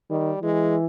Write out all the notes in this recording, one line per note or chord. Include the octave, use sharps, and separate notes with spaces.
D#3 G3
E3 G#3